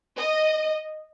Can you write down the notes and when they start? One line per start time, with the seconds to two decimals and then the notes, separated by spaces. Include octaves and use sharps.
0.17 D#5